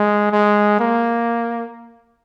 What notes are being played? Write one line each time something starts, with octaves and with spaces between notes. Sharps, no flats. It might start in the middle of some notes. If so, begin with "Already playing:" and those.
Already playing: G#3
G#3
A#3